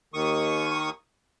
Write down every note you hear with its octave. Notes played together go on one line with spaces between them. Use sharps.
D#2 D#3 C#6 D#6